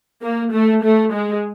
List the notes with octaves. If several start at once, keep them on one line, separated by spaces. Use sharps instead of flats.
A#3
A3
A3
G#3